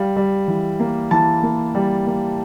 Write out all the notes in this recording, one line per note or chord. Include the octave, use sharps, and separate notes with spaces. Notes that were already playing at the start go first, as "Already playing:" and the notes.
Already playing: G3 F5
G3
E3
A#3
E3 A5
A#3
G3
A#3